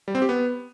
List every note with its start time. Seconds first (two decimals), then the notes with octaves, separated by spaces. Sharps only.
0.08 G3
0.15 C4
0.22 G4
0.29 B3